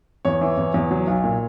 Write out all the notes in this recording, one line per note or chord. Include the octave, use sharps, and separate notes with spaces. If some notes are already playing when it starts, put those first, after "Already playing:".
E2 C#5
E3
E2
E2
F#3
B1
A#2